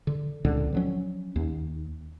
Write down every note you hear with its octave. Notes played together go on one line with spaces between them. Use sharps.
D3
C#2 A#2 D3 C4
F3 F#3 C#4
D#2